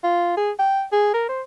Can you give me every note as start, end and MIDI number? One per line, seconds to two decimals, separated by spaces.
0.03 0.35 65
0.37 0.51 68
0.59 0.83 79
0.92 1.12 68
1.14 1.24 70
1.29 1.42 72